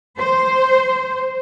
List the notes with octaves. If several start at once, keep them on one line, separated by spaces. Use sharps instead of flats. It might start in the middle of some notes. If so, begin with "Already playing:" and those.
C5